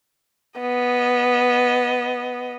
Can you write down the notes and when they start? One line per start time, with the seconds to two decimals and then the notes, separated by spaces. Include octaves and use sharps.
0.60 B3 D#5